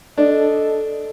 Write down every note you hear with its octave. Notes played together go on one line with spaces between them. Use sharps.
D4 A4 D#5